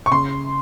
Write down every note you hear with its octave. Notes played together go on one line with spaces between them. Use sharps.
C#6
C#3 C6